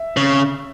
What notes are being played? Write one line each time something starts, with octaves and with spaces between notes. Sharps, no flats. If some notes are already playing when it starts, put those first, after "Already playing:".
Already playing: E5
C#3